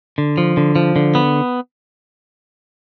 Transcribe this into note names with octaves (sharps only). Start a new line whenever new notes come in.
D3
F3
D3
F3
D3
B3